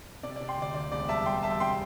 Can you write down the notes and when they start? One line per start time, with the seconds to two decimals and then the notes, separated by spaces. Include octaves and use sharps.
0.23 C3 D5
0.36 D5
0.41 C3
0.48 G5 C6
0.58 D2 D5
0.74 D2 D5
0.92 E1 D5
1.09 G3 E5 A5
1.26 G3 G5 C6
1.43 G3 E5 A5
1.60 C3 G5 C6